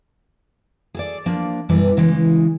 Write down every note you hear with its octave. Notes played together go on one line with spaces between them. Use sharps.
G#4 A4 D5
F3 A#3 D4
F#2 B2 E3 G3 B4
C#3 E3 G#3